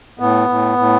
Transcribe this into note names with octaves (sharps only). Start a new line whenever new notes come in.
A2 B3
A2
A2